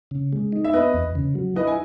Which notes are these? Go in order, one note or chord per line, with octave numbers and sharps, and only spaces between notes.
C#3
G#3
D#4
E5
B3 B4 D#5
E2
C#3
F#3
E4 B4 D#5
G#5